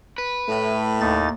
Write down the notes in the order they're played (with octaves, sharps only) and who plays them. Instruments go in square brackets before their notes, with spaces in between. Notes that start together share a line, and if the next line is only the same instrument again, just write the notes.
[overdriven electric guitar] B4
[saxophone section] A2 [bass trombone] A3
[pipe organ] D#2 D#4 A6